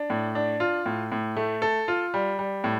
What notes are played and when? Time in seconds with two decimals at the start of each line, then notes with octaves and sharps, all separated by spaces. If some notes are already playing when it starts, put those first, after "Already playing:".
Already playing: D4
0.10 A2
0.35 D4
0.60 F4
0.86 A2
1.12 A2
1.37 A3
1.62 A4
1.88 F4
2.14 G3
2.39 G3
2.64 A2